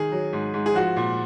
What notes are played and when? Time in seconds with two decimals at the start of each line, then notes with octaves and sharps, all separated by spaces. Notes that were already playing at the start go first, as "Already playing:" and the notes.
Already playing: D#3 G#4
0.12 F#3
0.33 G#2
0.54 G#2
0.66 G#4
0.75 F3 F#4
0.97 A#2